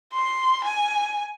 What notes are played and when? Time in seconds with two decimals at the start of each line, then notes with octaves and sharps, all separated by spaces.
0.13 C6
0.64 G#5